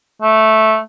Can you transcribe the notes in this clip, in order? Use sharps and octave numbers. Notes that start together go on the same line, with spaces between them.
A3